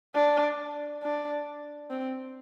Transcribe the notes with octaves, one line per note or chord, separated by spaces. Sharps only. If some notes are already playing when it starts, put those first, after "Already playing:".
D4
D4
C4